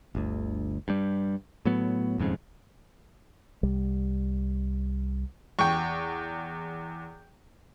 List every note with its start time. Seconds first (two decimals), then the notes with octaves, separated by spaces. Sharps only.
0.15 G1 D2
0.88 G2 G3
1.65 A2 F#3 B3
2.18 D#1 F2 G#2 C#3
3.63 C2 G3
5.59 E2 G5 C#6